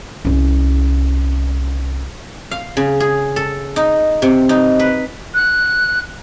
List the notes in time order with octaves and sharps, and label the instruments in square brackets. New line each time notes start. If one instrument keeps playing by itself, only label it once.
[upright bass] C2 C#4
[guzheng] F5
C#3
G#4
A4
D#4
C3
D#4
B4
[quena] F#6